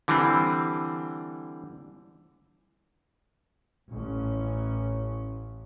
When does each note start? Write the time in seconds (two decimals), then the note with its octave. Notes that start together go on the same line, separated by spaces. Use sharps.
0.08 D3 E3 G3 C4
3.92 A1 C#4